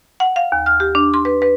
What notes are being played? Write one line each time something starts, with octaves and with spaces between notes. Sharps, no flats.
F#5
F5
D#2
F6
G4
D4
C6
B4
B4